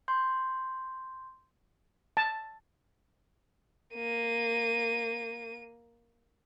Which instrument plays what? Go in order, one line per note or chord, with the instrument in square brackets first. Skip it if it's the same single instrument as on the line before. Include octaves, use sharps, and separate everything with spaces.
[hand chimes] C6 G6
[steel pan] A5
[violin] A#3 D#7